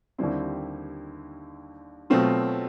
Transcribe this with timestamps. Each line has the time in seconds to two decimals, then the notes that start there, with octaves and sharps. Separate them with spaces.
0.18 D#2 D3 G3 C4 E4
2.10 B2 F#3 A3 C4 F4